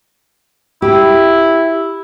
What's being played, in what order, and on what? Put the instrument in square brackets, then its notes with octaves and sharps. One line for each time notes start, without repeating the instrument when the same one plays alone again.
[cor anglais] E4 [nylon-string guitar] G4